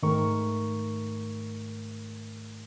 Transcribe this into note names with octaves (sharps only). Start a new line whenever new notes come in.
G#2 D#3 A3 A#4 C#6